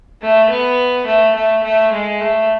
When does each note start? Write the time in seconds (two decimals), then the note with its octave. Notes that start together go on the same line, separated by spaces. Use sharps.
0.21 A3
0.50 B3
1.06 A3
1.35 A3
1.63 A3
1.92 G#3
2.20 A3